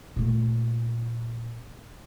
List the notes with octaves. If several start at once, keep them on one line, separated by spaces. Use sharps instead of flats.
A#2 A3